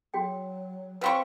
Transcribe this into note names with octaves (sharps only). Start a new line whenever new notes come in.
F#3 F#4 G#4 G5
C3 C4 B4 F5 B5 C#6